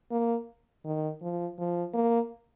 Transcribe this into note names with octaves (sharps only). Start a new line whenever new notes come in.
A#3
D#3
F3
F3
A#3